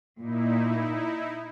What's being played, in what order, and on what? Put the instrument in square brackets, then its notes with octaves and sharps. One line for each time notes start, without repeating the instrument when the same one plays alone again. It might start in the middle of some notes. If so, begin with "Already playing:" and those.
[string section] A#2 [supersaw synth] D#4 E4